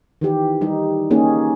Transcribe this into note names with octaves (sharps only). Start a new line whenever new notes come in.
D#3 E3 G4
G3 D#4
A#3 C#4 D#4 G#4